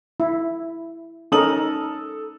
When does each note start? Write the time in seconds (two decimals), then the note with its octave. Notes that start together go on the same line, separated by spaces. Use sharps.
0.20 E4
1.32 C#4 D#4 A4 A#4 D#6 F#7